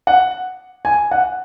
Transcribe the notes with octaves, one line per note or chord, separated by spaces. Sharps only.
F#5
G#5
F#5